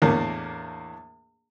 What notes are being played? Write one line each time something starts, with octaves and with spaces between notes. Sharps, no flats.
E2 A2 A#3 D4